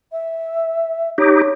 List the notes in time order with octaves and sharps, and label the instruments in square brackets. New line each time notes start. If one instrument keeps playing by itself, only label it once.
[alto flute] E5
[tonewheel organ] D#4 G4 [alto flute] C#5